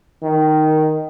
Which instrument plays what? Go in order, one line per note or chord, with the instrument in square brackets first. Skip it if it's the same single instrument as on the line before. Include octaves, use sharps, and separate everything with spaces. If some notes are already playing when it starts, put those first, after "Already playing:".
[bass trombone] D#3